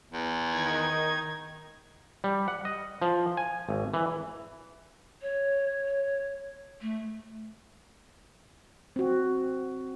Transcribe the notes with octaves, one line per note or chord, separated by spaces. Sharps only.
E2
D#3 D#4 G#6
G3
F#5
D#5
F3
G#5
G#1
E3
C#5
A3
C4 F#4